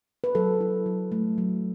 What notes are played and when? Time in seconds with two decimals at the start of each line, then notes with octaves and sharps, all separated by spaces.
0.24 B4
0.35 F#3 A4
0.60 E4
0.86 F#3
1.12 A3
1.38 F#3